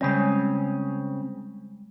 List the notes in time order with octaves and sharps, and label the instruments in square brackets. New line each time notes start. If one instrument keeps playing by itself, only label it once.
[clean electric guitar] C#3 C4 C#4 [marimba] G3 G#3